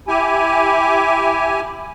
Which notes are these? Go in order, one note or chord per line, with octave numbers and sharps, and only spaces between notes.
E4 G4 G#5